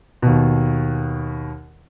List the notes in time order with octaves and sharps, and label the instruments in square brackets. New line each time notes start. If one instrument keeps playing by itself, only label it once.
[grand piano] D#2 B2